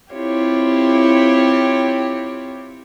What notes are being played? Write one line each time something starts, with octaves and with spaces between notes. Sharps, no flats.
C4 E4 F4 G4 C#5